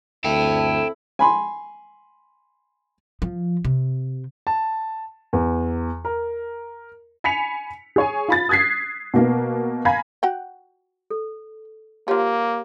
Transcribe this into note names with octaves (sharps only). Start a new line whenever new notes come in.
D2 C4 E4 A4 G5 A5
G#5 B5 C6
F3
C3
A5
E2
A#4
G#5 B5 B6 C#7 F7
G#4 C#5 G#5
F4 B5 A6
D#6 F#6 G#6 B6 C7
B2 A#3 B3
F5 G#5 A#5 B5 G#6
F#4 F#5 G5
A4
F3 A#3 F4 G4 C#5 F#5